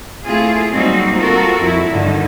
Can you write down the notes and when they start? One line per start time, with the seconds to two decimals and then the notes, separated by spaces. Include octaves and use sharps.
0.24 A3 C4 E4 F4 G#4
0.71 F#3 G3 A#3 C4 D#4 F#4
1.15 C4 F4 F#4 A4 A#4
1.59 F2 E4
1.90 G2 D3 D#3